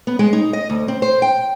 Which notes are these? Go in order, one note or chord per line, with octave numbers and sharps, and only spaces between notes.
B3
G#3
D#4
D#5
D2
C4
C5
G5